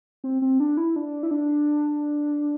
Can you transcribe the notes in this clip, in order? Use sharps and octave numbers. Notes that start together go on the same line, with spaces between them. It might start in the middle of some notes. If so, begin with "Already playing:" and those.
C4
C4
D4
E4
D4
E4
D4